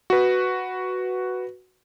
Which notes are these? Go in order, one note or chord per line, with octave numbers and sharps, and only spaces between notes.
F#4 B4